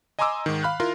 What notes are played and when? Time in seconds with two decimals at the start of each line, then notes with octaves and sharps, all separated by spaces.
0.19 D#5 G#5 A#5 C6 D6 E6
0.46 G#2 D#3
0.63 F5 B5 F6 F#6
0.80 E4 F4 A#4 C6